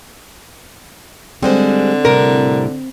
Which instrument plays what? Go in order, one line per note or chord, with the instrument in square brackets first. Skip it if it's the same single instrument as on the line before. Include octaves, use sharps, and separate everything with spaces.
[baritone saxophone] D3 [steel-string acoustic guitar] G3 G#3 C5 [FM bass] C4
[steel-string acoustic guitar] A2 C3 G3 [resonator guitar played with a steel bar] A#4